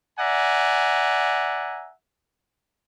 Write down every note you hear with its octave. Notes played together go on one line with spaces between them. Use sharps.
D5 E5 F#5 G#5 A#5